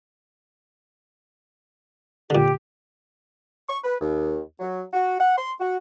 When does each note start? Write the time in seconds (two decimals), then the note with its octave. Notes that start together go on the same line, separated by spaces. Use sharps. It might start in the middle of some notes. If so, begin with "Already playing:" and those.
2.30 A#2 D3 G4
3.69 C#6
3.84 B4
4.01 D#2
4.60 F#3
4.93 F#4
5.20 F#5
5.37 C6
5.60 F#4